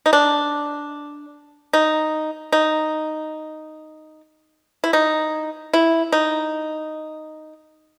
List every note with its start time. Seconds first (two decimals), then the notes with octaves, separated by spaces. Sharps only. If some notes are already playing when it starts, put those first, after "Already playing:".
0.06 D#4
0.13 D4
1.73 D#4
2.52 D#4
4.84 E4
4.93 D#4
5.73 E4
6.12 D#4